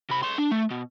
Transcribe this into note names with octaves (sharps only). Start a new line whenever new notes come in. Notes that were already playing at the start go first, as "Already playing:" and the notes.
C3 B5
C#5 C6
D4
A3
B2